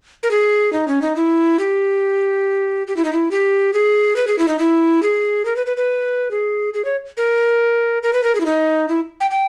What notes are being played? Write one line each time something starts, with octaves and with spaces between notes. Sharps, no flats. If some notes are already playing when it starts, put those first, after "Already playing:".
A#4
G#4
D#4
C#4
D#4
E4
G4
G4
E4
D#4
E4
G4
G#4
B4
G#4
E4
D#4
E4
G#4
A#4
B4
B4
B4
G#4
G#4
C#5
A#4
A#4
B4
A#4
G#4
E4
D#4
E4
G5
G5